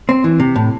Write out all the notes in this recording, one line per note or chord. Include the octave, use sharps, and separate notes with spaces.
C4
E3
C3
A2